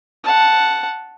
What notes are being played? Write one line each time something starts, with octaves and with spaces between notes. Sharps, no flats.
F#5 A5